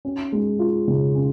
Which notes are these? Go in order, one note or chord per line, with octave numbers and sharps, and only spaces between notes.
C#4
G#3
F4
C#3
C#4